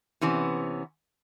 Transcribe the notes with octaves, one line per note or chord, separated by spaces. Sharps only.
C3 E3 B3 C#4